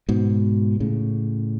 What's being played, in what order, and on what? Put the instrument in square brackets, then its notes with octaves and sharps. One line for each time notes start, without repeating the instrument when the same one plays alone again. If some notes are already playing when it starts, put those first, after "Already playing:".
[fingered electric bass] G#2 B2
A2 C#3